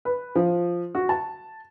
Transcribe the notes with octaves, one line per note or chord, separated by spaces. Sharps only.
B4
F3
F#4
A5